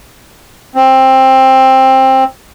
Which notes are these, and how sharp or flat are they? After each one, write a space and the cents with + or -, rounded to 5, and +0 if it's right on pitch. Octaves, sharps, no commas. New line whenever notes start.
C4 +15